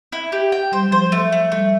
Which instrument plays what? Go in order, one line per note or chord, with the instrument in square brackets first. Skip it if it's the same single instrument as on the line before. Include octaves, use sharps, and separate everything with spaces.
[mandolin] E4
G4
G5
[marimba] G3 [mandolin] C5
[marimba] F#3
[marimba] F3 [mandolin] C5
[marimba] F#3
[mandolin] A3
A3
[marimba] G3 [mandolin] A3